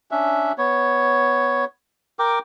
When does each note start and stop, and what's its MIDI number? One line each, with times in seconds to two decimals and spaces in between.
0.11 0.52 61
0.11 0.52 62
0.11 0.52 76
0.58 1.65 59
0.58 1.65 73
2.19 2.39 70
2.19 2.39 79
2.19 2.39 86